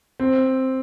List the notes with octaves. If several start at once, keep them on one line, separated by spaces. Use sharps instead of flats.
C4